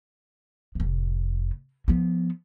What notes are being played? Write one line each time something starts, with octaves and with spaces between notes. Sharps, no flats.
F1 A2
F3 B3